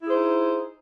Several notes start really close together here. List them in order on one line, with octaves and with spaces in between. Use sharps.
E4 G#4 C5 D#4